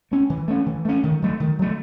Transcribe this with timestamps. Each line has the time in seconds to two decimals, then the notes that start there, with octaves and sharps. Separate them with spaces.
0.11 A3 C#4
0.30 E3
0.48 A3 C#4
0.66 E3
0.85 A3 C#4
1.03 D#3
1.22 F#3 A3
1.40 D#3
1.59 F#3 A3